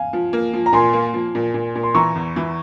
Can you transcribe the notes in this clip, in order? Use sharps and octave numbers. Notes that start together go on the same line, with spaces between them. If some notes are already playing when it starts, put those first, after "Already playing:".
Already playing: F5 G#5
F3
A#3
F3
A#5
A#2 G#5 C6
A#3
F3
A#2
A#2
A#2
C6
E3 A#5 C#6
E2
E3